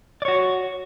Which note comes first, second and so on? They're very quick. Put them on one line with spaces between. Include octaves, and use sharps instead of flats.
D5 C#5 F#4